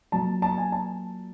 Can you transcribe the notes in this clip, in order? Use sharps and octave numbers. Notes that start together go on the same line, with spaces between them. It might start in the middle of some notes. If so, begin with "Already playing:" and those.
A#2 F#3 A5
A5
G#5
A5